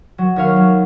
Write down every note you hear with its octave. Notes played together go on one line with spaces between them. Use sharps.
F#3
D#2 C#5 F5
F#3